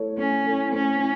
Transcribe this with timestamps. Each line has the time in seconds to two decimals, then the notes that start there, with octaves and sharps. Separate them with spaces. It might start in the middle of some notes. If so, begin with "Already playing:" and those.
Already playing: A3 E4 A4 C#5
0.17 A3 C#4
0.45 E4 A4 C#5
0.72 A3 C#4
1.00 E4